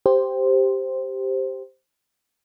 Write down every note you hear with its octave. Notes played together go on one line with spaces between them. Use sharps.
G4 C5